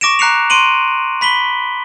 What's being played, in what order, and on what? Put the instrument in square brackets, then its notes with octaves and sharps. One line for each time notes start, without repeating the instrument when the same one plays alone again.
[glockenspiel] C#6 D6 A#6 D7 E7
A#5 F#6 C7 C#7 F7
C6 D7 D#7 F#7
B5 B6 F#7 G7